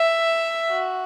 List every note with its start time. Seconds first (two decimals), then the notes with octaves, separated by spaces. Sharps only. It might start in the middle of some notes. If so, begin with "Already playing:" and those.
Already playing: E5
0.69 F#4